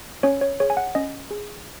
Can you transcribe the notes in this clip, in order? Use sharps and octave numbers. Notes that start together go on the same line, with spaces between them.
C#4 C#5
C#5
G#4 C#5
G#5
F#5
C#4 D#5
G#4